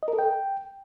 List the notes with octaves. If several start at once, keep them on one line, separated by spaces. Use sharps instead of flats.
D#5
A#4
A4
G5